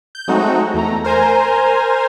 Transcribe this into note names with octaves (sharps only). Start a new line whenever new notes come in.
G6
F#3 G#3 A3 C4 D#4 F#4
E2 A3 A#5
A#4 C5 G#5 A#5